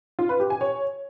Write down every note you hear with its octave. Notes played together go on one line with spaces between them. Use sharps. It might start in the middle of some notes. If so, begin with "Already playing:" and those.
F4
B4
G4
G#5
C#5